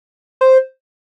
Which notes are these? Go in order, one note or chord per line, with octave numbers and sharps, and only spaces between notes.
C5